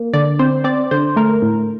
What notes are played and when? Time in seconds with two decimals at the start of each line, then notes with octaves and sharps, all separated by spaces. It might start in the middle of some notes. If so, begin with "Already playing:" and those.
Already playing: A#3
0.14 D3 D5
0.39 C4 C5
0.64 C4 D5
0.91 D3 C5
1.16 A3 A#4
1.42 A2